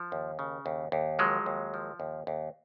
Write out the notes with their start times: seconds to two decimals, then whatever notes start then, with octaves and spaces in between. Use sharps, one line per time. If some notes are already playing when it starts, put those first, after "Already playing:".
Already playing: F3
0.12 D#2
0.39 C#3
0.66 D#2
0.92 D#2
1.19 F3 F#3 G#3
1.46 D#2
1.74 F3
2.00 D#2
2.27 D#2